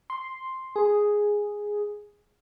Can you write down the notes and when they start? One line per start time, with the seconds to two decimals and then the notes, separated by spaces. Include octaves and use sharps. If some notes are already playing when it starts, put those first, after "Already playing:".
0.10 C6
0.76 G#4